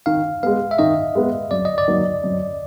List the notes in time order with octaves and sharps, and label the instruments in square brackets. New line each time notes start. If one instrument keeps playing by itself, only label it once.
[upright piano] D#3 [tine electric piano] F5
[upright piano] G#3 B3 [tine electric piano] F5
[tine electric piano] E5
[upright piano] D#3 [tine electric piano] D#5
[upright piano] G#3 B3
[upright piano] F#2 [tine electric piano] D5
[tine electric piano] D#5
D5
[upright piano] D#3 F#3 A#3
F#2